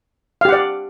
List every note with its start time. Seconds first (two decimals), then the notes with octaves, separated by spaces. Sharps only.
0.41 F5
0.45 G4
0.49 F#5
0.53 D5